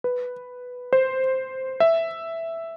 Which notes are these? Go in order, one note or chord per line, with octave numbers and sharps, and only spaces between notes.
B4
C5
E5